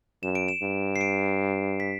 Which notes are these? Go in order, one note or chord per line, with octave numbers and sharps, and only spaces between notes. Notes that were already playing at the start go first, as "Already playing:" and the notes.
F#2 E7
D7
E7
G2
C7
D7
B6